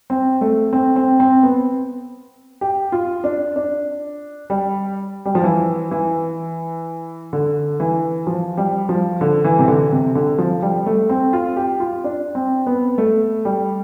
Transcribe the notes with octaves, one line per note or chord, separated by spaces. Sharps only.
C4
A3
C4
C4
C4
B3
G4
F4
D4
D4
G3
G3
F3
E3
E3
D3
E3
F3
G3
F3
D3
E3
C3
D3
C3
D3
F3
G3
A3
C4
F4
G4
F4
D4
C4
B3
A3
G3